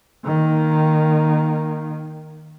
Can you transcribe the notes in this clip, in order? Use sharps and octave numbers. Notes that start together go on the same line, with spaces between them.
D#3 A#3